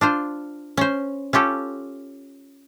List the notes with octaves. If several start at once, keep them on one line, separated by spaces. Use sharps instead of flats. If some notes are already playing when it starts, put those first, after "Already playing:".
D4 F4 C5
C#4 C5
C#4 F4 G4 A4